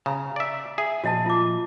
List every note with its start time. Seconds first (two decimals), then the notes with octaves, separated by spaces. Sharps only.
0.06 C#3 A5 A#5
0.36 D5 E5
0.78 G#4 E5
1.04 A#2 F3 F#4 D#5 A5
1.26 F4 D6